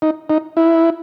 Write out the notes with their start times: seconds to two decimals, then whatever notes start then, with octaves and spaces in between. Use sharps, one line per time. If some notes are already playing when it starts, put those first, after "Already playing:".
0.02 D#4
0.30 D#4
0.57 E4